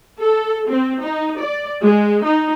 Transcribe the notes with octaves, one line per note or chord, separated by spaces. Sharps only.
A4
C4
D#4
D5
G#3
D#4